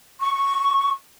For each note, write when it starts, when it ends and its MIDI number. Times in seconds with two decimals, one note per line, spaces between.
0.19 0.90 85